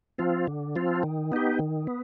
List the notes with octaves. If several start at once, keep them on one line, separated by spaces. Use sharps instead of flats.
F3 C4 F4
D3
F3 C4 F4
D#3
B3 D#4 G4
D#3
B3